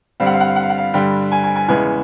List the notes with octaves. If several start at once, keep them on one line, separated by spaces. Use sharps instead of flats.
G2 D3 G3 C4 F5
F#5
F5
F#5
F5
F#5
F5
F#5
F5
G2 D3 G3 G5
G#5
G#5
G#5
E2 C#3 E3 G#3 B3 G#5